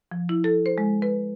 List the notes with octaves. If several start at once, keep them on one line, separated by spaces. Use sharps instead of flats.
F3
E4
A4
C5
G#3
B4